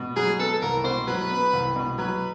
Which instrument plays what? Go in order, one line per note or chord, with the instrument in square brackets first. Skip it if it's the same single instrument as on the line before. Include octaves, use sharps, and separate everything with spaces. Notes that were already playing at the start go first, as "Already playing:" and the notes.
Already playing: [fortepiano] B2
[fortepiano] F#3 [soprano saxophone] G#4
[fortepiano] B3 [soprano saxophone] A4
[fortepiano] C2 [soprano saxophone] A#4
[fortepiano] B2 [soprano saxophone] C5
[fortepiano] F#3 [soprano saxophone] B4
[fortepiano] B3
C2
B2
[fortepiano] F#3 [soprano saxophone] B4